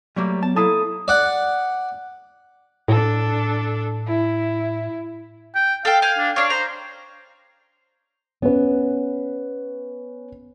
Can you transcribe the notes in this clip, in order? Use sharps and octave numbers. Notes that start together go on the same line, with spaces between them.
F#3 G3 A3 A#3
B3 A5
A#3 E4 A4 A5 D#6
D5 F#5
A2 D4 A4
E4
G5
A4 F5 G5
F5 G5 G#5
D4
D4 C#5 F5
C5 A#5
B3 C#4 B4